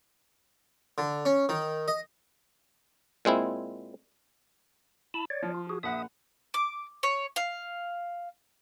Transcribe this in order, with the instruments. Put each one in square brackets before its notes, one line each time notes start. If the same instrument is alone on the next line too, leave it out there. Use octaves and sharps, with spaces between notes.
[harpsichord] D3
C#4
D#3
D#5
[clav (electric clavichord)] A#2 G#3 C4 E4
[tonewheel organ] E4 A5 B5
C#5 D5
[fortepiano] F3
[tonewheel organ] F4
F#4 G#4
[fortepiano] A#1 F#5 [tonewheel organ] E5 D#6
[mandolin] D6
C#5
F5